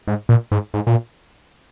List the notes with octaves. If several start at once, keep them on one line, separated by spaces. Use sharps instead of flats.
G#2
A#2
G#2
G#2
A#2